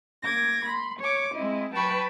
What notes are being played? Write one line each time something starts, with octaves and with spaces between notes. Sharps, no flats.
A#3 D6 G#6 A#6
B5 C6
C#5 C#6 D6
G#3 C4 E4 D#5
F#3 B4 G5 A5 B5 C#6